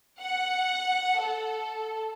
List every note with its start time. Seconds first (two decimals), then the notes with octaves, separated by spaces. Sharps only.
0.21 F#5
1.19 A4